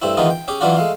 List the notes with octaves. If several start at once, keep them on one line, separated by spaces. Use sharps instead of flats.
G2 A3 C4 E4
D#3 E3 G#3 B3 D#4 F4
G5
C#4 G4 G#4
E3 F#3 C#4 D4 F4 F#4
G#3 A3 F5